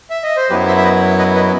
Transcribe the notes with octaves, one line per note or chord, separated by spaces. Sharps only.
E5
D#5
C5
F#2 F#3 B3 E4 G4 B4
C5 E5
E5
B4 D#5
B4 D#5
B4 D#5